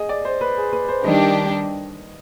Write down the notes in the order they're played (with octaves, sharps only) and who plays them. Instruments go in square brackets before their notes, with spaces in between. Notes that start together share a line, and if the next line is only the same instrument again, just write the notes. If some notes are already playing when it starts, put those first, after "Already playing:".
Already playing: [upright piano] G#4 D#5
D5
C5
B4
G#4
B4
C5
[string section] D#3 G3 D4 G4 [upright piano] D#5